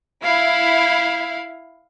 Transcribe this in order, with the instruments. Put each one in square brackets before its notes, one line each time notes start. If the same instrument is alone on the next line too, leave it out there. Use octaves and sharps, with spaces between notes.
[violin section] E4 [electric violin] F5